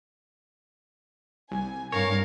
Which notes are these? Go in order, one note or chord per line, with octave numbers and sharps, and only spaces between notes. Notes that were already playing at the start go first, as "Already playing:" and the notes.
C2 G#5
G2 A#4 C#5 F5